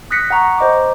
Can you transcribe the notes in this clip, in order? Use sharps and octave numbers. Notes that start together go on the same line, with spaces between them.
D#6 F#6 A#6 B6 C#7
F#5 G5 A#5 C#6
C5 D#5 A#5 D6